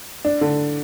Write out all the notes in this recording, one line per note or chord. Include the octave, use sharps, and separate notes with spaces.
D4
D3